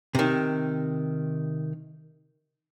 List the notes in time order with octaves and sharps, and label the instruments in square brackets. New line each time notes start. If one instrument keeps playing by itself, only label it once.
[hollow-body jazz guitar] C3 D#3